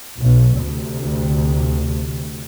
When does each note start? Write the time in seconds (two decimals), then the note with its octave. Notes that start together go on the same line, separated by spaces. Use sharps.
0.19 B1 B2
0.63 D2 C3